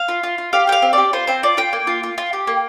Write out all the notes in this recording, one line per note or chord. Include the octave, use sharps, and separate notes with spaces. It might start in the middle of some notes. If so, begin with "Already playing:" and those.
Already playing: F5
F4
F4
F4
G4 F5
G4 G5
F5
C4
G4 D5
F4 C5
C4 C5
F4 D5
F4 G5
A#3
F4
F4
F4
G4
A#3